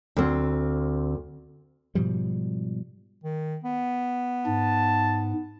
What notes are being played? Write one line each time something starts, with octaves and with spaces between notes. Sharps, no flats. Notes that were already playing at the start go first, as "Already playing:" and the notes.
D2 C4
G#2 B2 F3 G3
D#3
B3
G#2 A5